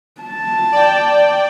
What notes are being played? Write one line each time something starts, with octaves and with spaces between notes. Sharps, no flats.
A5
D5 G5